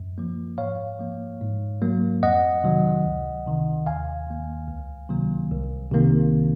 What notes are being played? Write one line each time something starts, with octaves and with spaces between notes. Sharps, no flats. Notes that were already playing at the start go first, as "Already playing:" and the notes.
Already playing: F#2
F3 A#3
G#2 C#5 F5
F3 A#3
G#2
F#3 A#3
F2 D#5 F#5
C3 D#3 F#3
C#2
C3 D#3
D#2 F5 G#5
D#3 A#3
C#2
C3 D#3 F#3 A#3
C2
C3 D#3 A#3